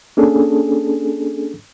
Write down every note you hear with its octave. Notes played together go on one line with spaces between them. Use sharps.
A#3 C#4 D4 G#4 A4